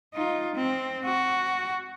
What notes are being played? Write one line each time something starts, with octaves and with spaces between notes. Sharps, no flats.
D#4 F4
C4
F#4